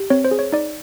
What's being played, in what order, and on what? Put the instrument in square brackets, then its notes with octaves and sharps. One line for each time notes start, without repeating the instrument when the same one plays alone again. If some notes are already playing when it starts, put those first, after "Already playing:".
Already playing: [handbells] G4
C4 C#5
C5
G#4
C#5
D#4 D5